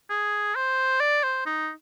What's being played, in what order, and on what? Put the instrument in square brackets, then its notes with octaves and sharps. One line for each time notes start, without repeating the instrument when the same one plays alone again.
[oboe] G#4
C5
D5
C5
D#4